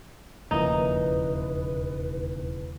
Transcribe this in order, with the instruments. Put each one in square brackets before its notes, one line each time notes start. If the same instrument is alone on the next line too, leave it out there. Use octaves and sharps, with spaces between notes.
[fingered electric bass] E1 D#2 C#3 [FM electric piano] F3 A#3 E4 [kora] D#4 [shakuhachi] B4